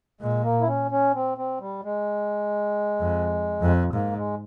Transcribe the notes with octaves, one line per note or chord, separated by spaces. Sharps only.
A#2 G#3
A#3
E4
C#4
C#4
C4
C4
G3
G#3
F2
F2
G#2 A#3
G#3